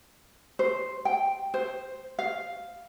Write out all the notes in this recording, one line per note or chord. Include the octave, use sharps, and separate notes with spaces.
C5
G5
C5
F5